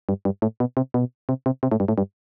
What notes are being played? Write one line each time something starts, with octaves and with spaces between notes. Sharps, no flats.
G2
G2
A2
B2
C3
B2
C3
C3
C3
A2
G2
A2
G2